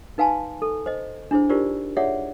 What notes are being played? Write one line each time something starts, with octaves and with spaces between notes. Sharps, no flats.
D#4 B4 F5 G#5 A5 C6
A4
C5 D#5
D4 E4 G#4 C5
D#4 F4 G4 A#4 C5 D5
F4 G#4 C#5 D5 E5 F#5